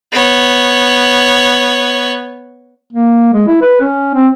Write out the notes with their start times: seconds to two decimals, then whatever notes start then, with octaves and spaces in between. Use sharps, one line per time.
0.12 B3 C#5
2.92 A#3
3.33 G#3
3.47 E4
3.61 B4
3.81 C#4
4.14 C4